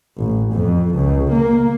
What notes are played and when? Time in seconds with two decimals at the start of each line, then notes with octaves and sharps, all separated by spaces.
0.17 A1
0.53 F2
0.95 C#2
1.32 A#3